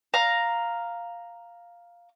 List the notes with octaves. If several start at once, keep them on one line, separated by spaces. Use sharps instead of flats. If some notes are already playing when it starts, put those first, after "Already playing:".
F5 A#5